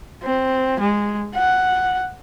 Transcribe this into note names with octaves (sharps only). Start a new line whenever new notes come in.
C4
G#3
F#5